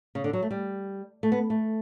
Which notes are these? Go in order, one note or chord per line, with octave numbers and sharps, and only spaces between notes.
C#3
D3
F#3
A3
G3
A3
B3
A3